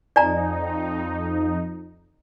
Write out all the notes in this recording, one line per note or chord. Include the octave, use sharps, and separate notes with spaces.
F2 D#4 D5 G#5 A#5